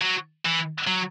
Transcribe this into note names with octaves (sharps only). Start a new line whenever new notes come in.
F#3
E3
F#3